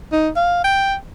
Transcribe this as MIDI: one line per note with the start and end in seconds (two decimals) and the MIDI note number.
0.12 0.29 63
0.36 0.62 77
0.64 0.95 79